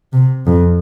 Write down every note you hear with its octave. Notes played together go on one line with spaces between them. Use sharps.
C3
F2